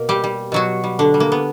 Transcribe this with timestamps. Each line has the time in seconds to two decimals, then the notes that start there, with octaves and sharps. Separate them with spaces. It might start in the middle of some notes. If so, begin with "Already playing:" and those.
Already playing: B2 A#3 A#4
0.09 G3 G4
0.24 G3
0.52 B2 F#3 F#4
0.84 G3
0.99 D3 D4
1.14 G3
1.20 A#3
1.32 B3